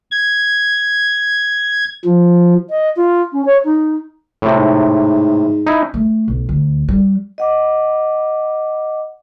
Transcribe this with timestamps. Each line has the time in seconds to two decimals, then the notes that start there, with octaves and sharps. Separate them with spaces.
0.11 G#6
2.05 F3
2.70 D#5
2.96 F4
3.32 C#4
3.45 C#5
3.64 D#4
4.42 A2 C3
4.56 G#2
5.66 D#4 E4
5.94 A3
6.28 B1
6.49 D2
6.89 G3
7.38 D#5 F#5 D6